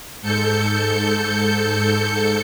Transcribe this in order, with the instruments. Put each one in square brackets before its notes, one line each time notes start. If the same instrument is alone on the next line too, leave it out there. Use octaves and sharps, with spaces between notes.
[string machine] G#2 A4 G6 C#7